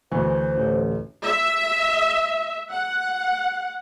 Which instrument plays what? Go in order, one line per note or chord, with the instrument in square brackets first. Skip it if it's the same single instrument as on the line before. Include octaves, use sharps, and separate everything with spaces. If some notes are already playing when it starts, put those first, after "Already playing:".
[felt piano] D2 G#5 C#6 [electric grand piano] E3 [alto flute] C5
[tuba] A1
[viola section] E5
F#5